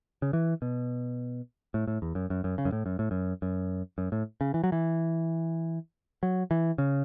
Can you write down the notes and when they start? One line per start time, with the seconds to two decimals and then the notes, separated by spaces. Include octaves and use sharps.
0.22 C#3
0.33 E3
0.62 B2
1.74 A2
1.87 A2
2.02 E2
2.15 F#2
2.30 F#2
2.44 F#2
2.58 C#3
2.65 F#2
2.72 A2
2.86 F#2
2.99 A2
3.11 F#2
3.42 F#2
3.98 F#2
4.12 A2
4.41 C#3
4.54 E3
4.64 F#3
4.72 E3
6.23 F#3
6.51 E3
6.78 C#3